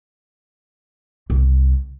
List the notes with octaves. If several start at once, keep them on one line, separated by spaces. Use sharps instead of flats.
C2